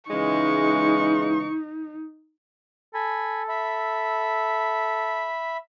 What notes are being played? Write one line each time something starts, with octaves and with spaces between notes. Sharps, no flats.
C#3 E3 G#3 D#4 C#6
A4 G#5 B5
E5 B5